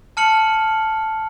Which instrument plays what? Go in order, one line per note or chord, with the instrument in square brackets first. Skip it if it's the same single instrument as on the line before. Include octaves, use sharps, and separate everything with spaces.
[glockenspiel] A5 F6 C#7 F#7